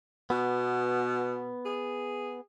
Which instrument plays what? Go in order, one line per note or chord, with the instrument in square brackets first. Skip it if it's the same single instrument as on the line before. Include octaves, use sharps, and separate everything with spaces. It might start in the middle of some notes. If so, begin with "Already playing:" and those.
[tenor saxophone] B2 [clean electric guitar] B3
[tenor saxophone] G#4